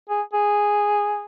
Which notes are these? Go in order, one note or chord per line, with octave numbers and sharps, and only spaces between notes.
G#4
G#4